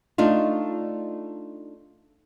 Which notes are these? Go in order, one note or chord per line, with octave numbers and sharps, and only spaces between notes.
A3 D4 D#4 F4